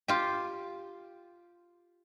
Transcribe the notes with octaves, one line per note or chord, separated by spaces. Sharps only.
F4 G4